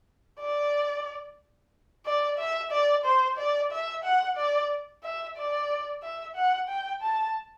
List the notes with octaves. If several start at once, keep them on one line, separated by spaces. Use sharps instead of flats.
D5
D5
E5
D5
C5
D5
E5
F#5
D5
E5
D5
E5
F#5
G5
A5